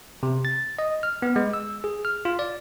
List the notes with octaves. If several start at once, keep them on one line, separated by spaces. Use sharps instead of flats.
C3
A6
D#5
F6
B3
G#3
E6
G#4
F6
F4
D5